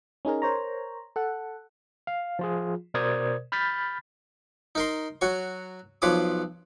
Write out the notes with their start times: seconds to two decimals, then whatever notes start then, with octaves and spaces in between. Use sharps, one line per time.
0.25 C#4 D#4 G#4 A#4
0.42 A#4 C5 C#5 A#5
1.16 A4 F#5
2.07 F5
2.39 F3 F4 G#4
2.94 B2 A#4 C5 D5 D#6 G#6
3.52 B5 F6 G6 A6 B6
4.75 D#4 A#4 C6
5.21 F#3 F#4 C#5 C#6
6.02 B1 F3 B4 C#5 D6 D#6